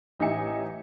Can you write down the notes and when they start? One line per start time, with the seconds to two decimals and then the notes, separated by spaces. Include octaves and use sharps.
0.19 A1 D#4 G4 E5 G#5 C#7